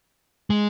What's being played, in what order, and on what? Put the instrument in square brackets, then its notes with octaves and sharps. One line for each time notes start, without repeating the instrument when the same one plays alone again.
[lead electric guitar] G#3